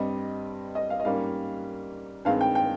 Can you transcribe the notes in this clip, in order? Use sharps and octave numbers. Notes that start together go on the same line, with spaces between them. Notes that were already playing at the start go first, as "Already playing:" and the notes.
Already playing: G2 G3 C4 D#5
D#5
F5
D#5
G#2 G3 A#3 C#4 F5
G2 D#3 G#3 C4 F5
G5
G5